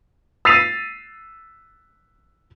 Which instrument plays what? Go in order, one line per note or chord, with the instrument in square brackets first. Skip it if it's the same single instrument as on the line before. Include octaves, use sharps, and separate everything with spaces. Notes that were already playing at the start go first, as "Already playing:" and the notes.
[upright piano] E6 A6 B6 C7 D#7 F7